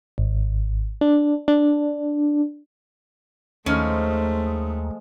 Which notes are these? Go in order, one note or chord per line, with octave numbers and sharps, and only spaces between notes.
G#1
D4
D4
D#2 D#3 F3 G#3 A3 C#4